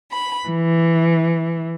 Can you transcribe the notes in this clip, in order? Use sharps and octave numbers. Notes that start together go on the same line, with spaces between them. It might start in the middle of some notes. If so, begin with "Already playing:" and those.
B5
E3